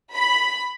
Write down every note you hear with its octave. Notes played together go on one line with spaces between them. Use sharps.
B5